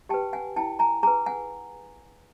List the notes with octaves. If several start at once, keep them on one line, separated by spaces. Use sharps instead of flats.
G4 B4 G5 A5
F#5 G#5
E4 G5 A5
G#5 A#5
G#4 B4 G#5 A#5
F#5 G#5